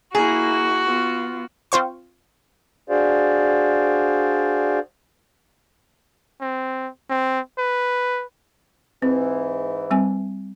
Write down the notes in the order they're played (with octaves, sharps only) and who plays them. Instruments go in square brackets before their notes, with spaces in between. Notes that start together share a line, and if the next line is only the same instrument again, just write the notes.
[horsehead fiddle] A#3 E4 [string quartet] F#4 [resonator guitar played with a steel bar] G#4
[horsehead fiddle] B3 F4
[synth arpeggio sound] C4 F4 C5 C#6
[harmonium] D4 F#4 G#4 C5 D5 F5
[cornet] C4
C4
B4
[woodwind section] G#2 E3 [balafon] C4
[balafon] G3 C4 G#5